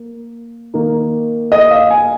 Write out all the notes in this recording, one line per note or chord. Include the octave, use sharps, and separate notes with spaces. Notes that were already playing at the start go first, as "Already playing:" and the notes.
Already playing: A#3
D#3 A#3 D#4
D#5
F5
G#5